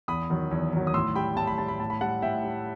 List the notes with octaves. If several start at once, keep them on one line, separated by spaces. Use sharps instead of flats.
E2 B5 D#6
D#3 F#3
E2
D#3 F#3
D#6
A2 C6 E6
G3 G5 B5
A2 A5
B5
G3 A5
B5
A2 A5
B5
G3 F#5 A5
A2 E5 G5
G3